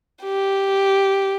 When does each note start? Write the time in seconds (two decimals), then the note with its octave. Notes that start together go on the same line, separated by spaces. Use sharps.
0.23 G4